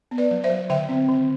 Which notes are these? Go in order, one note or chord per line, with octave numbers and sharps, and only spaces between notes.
B3
B4 D5
F#3
C5 E5
F#3
D3 E5 G5
C4
D3